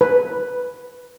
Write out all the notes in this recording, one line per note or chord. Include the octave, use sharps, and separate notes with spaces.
B4